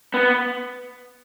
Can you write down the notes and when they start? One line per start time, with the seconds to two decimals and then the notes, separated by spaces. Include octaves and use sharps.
0.14 B3